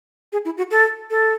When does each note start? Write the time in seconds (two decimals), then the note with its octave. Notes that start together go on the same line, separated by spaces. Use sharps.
0.33 G#4
0.45 E4
0.57 F#4
0.71 A4
1.10 A4